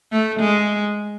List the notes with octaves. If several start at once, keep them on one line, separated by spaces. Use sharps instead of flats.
A3
G#3